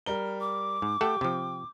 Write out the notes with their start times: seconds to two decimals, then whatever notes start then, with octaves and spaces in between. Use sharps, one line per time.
0.06 G3 A#4 G7
0.41 D6
0.82 G#2
1.01 A3 G4 A4 F#5 G5
1.21 C3 F3 G5